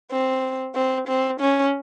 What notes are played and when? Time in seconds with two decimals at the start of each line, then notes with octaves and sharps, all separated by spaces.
0.11 C4
0.75 C4
1.08 C4
1.40 C#4